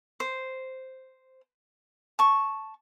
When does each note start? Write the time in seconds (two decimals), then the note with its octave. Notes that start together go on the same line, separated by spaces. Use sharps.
0.20 C5
2.19 A5 C#6